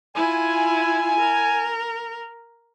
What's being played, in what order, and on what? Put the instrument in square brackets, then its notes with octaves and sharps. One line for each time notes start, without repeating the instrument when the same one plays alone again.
[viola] E4 F4 [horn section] G#5
[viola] A#4